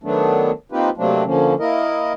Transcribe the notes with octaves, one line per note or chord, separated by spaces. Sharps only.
D#3 F#3 A3 B3 D4
A#3 C4 D#4 F4 G4 B4
C3 F#3 A3 A#3 C4 D4
D3 F3 A#3 C#4
A#3 E4 A#4 D#5